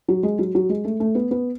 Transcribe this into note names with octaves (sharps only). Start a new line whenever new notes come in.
F#3
G#3
F#3
F#3
G#3
A3
A3
B3
B3